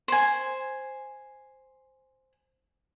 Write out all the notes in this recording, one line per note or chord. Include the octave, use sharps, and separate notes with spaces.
C5 G#5